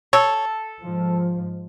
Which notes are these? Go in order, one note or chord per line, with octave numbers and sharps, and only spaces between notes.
A4 C#5
G#2 F3